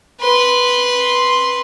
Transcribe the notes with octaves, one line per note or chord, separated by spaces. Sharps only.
B4 C6